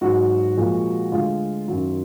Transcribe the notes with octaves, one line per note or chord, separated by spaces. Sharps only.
G#2 F#3 F#4
A#2 F3 G#3
D2 D3 G#3 F4
F#2 D#3 F#3